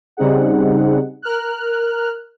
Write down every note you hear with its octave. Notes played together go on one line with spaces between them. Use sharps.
C#3 G3 C4 D#4 G#4 F#5
A#4 F6 F#6